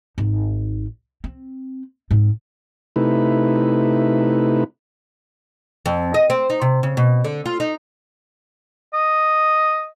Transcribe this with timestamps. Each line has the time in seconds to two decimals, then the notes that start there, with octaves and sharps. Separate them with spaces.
0.18 G#1 D#4
1.24 C4
2.11 G#2 C4
2.96 C3 A3 D#4 E4 B4
5.86 F2
6.14 D#5
6.30 C4
6.50 D#4
6.62 C3
6.83 C#3
6.97 B2
7.25 D3
7.46 F4
7.60 D#4
8.94 D#5